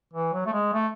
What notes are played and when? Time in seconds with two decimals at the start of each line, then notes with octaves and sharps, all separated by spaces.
0.13 E3
0.33 F#3
0.46 A3
0.53 G#3
0.73 A3